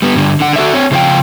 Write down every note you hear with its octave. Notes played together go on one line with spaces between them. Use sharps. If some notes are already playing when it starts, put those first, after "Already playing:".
G3 B3
G2 D3
D3 F#5
F#4 A4 D5 E5
C4 C#5
C#3 F3 C5 F5 G5